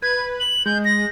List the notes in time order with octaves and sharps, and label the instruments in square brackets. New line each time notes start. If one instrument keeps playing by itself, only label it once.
[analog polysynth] B4 [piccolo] G#6
[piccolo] F#7
[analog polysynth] G#3 [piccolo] G6
[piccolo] A#6